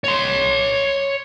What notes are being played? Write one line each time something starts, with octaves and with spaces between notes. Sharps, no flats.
C#5 C6